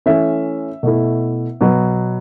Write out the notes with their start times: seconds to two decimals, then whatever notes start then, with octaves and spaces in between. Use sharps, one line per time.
0.06 E3 A3 C#4 E5
0.83 B2 A3 E4
1.61 B2 F#3 B3